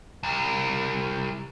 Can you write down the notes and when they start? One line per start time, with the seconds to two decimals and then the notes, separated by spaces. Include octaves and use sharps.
0.23 C2